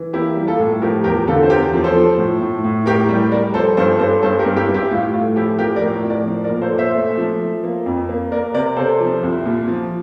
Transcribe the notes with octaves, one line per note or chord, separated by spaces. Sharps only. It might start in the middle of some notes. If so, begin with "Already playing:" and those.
Already playing: E3
A#3 E4 G4
G3
F4 A4
A2
F3 G4 A#4
E2 G4 A#4
D3 F4 A4
C5
E2 G4 A#4
F3
A4 C5
F3
A2
A2
A2
A2 G4 A#4
G3
G3 A#4 D5
F3 A4 C5
G2 A4 C5
G2 A4 C5
G2 A4 C5
G4 A#4
G2
E4 G4
G2
E4 G4
A2 F4
A3 F4
F3 E4 G4
F3 G4 A#4
A#4 D5
A2
F3
A#4 D5
F3
A#4 D5
A#2
A4 C5
A#2
C5 E5
A3
F3
F3
A#3
F2
A#3
A#3 A#4 D5
C3 A#4 D5
C3 A4 C5
F3
C2
A#2
F3